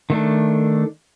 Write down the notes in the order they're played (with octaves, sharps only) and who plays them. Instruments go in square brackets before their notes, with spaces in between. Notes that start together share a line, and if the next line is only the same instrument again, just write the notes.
[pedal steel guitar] D#3 A3 D4